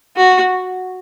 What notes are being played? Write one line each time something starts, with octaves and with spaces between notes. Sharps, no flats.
F#4